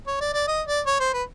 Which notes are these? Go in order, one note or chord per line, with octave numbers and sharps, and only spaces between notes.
C#5
D5
D5
D#5
D5
C#5
C5
B4